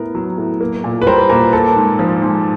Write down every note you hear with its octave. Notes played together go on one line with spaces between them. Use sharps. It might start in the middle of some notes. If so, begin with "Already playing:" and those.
Already playing: A2 B3 A#4
F#3
A2
A#3
A#2
B4
G3 A#4 C5
A#2 A#4
A#3 A4
G#2
F3
G#2